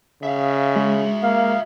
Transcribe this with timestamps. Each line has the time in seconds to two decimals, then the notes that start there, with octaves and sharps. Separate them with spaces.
0.23 C#3 E5 F5
0.76 G#3 F#4 E5
1.23 A#3 F5